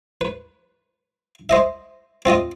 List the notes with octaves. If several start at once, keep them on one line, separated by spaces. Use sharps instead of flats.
B4
C5 D#5 E5
C4 F4 D#5 D#6